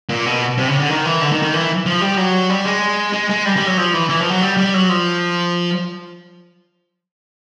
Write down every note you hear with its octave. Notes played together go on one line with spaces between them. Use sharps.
A#2
B2
C3
C#3
D3
D#3
E3
D3
D#3
D#3
E3
F3
G3
F#3
G3
G#3
G#3
G#3
G3
G3
F#3
F3
E3
E3
F3
F#3
G3
G3
F#3
F3